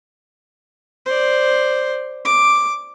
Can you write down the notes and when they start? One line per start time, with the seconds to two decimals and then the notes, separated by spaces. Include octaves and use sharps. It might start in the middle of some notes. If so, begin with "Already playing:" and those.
1.06 C5 D5
2.25 D6